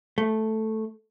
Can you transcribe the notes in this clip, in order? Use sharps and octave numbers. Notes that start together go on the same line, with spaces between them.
A3